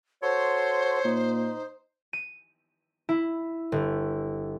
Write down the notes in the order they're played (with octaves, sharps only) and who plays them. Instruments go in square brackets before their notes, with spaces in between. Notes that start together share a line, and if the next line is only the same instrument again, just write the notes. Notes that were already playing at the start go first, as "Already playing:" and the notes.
[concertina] F#4 A4 C6 [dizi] C5 [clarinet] C#5
[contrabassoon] A#2 [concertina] D#4
[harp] D#7
E4
G1